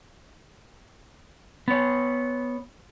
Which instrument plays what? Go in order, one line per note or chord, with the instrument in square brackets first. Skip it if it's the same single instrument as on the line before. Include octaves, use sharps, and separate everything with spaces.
[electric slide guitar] B3 C#5